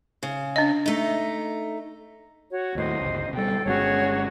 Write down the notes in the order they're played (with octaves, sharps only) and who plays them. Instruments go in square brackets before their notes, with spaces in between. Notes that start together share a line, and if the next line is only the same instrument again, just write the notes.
[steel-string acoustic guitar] C#3
[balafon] D4 D#5
[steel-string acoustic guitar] A3 D#4
[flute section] F#4 C#5
[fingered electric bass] D#2 A2 [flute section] C5 D#5
[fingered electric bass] G1 C#2
[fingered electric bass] B2 G3 [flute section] A4 G5
[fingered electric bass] G1 G#3 C#4 [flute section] F#4 G#4 C#5